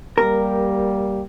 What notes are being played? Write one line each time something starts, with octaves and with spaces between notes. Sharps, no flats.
G3 A#3 G4 A#4